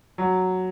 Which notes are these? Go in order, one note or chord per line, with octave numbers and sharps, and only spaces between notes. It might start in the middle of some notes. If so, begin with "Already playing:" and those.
F#3